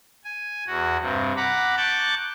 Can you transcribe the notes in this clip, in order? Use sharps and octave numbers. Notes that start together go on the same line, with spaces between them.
G#5
E2 F#4
G2 C3
F#5 A#5 B5 D6
A5 C#6 D6 F#6 G6 A6